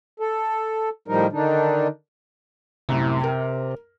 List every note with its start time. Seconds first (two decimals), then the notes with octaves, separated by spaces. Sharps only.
0.20 A4
1.08 A2 D#3 F3 G3 D#4 A#4
1.32 D3 D#3 D4 D#4
2.89 C2 F#2 A2 C3
3.24 A#4